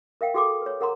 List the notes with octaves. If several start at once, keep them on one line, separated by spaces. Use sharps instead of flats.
A#4 E5 F5 G5
F#4 G#4 A4 G5 C6 D6
B4 C#5
G#4 A#4 F#5 A#5 C6